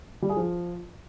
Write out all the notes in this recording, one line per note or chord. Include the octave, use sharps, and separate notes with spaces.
G3
G#4
F3